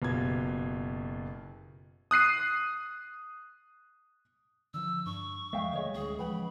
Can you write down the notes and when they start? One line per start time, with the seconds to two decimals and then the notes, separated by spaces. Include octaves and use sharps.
0.02 F#1 B2 F4 G4 G#6
2.11 D#6 F#6 C7 D#7
4.74 D3 F3 E6
5.06 G2 D4 C#6
5.53 E1 F3 G#3 E5 F5 G5
5.73 D3 G3 A3 G#4 C#5 D#5
5.95 D1 D3 C#4 G#4
6.18 E3 F3 C#4 B4 F#5 G5 B5